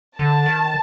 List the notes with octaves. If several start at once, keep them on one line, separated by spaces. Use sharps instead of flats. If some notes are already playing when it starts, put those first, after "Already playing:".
D3 A5
D#3